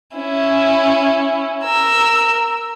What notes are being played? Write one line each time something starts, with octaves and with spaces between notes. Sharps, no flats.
C#4 E4
A#4 E6